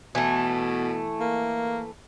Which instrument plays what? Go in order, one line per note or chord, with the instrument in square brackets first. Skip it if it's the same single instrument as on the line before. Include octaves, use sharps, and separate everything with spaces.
[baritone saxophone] B2 [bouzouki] E3 A3
[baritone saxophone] A#3